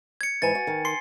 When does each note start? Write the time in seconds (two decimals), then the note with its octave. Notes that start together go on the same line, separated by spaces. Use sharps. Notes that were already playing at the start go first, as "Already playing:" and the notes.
0.21 G#6 C#7
0.42 G#2 E3 G#5 A6
0.55 F#4
0.67 D#3
0.85 C6 C7